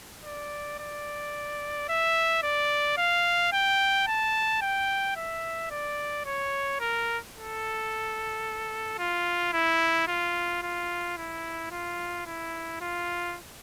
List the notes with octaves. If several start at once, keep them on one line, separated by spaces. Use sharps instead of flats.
D5
D5
E5
D5
F5
G5
A5
G5
E5
D5
C#5
A#4
A4
F4
E4
F4
F4
E4
F4
E4
F4